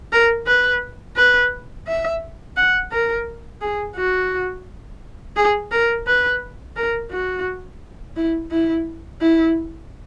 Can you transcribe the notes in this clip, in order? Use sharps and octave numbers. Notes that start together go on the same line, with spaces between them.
A#4
B4
B4
E5
F#5
A#4
G#4
F#4
G#4
A#4
B4
A#4
F#4
E4
E4
E4